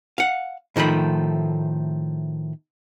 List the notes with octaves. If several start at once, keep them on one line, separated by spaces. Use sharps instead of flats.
F5 F#5
A2 D#3 F3 A3 B5